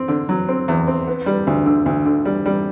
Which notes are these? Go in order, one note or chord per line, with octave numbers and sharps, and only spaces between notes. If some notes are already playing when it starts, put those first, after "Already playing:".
Already playing: C4
D3
F#3
C4
E2
C4
B3
G3
D2
D3
D2
D3
G3
G3